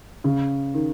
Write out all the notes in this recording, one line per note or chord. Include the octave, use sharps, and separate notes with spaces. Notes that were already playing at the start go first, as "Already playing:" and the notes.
C#3
D#3